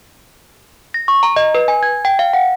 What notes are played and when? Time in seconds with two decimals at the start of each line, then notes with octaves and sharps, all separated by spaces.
0.94 A#6
1.08 C#6
1.23 A#5
1.36 D#5
1.55 B4
1.68 G#5
1.83 G#6
2.05 G5
2.19 F5
2.33 F#5